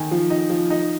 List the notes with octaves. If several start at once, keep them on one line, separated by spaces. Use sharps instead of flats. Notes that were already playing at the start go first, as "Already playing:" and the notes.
Already playing: D#3 G#5
F3
D#4
F3
D#4